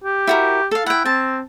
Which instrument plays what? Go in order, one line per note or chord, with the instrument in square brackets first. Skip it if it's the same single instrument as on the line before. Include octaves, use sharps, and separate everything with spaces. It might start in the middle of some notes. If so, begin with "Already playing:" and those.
[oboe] G4
[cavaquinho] E4 F#4 A#4
A4 F5
[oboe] E4 [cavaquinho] F#5 G5
[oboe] C4 [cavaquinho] A5